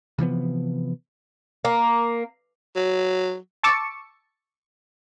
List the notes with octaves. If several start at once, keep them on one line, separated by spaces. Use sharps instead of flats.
C3 E3 F3 B3
A#3
F#3
A5 C#6 D6 E6 A6 C#7